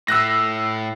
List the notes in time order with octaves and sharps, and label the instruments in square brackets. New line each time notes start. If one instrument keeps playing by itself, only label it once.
[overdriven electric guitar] A2 [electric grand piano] E6 F#6 A#6